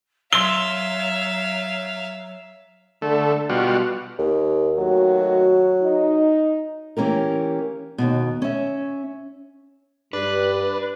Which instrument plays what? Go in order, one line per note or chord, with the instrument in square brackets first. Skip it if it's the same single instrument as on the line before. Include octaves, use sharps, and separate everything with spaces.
[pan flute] F#3 [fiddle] E5 F5 [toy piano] C6 E6 [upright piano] G7
[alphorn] D3 [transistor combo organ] A3
[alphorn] B2 [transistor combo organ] G3 F4 F#4
[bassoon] D#2
[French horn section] D#2 A3 F#4 [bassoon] F#3
[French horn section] D#4
[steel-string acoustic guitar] E3 A#3 C#4 G4 A#4
D#2 G#2 B2
C#4 E5
[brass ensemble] G2 [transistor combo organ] D4 [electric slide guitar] B4